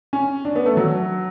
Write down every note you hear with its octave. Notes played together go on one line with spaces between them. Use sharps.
C#4
D4
B3
A3
F#3